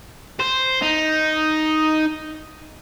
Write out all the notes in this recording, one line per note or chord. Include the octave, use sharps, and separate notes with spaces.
C5
D#4